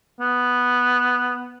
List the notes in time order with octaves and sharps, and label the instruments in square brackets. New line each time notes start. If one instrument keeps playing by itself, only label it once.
[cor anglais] B3